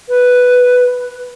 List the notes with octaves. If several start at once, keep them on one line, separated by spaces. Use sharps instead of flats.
B4